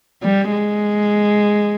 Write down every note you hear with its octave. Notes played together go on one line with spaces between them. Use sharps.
G3
G#3